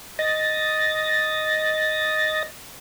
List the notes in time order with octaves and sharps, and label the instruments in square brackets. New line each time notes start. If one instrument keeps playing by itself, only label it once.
[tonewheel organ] D#5 A6 A#6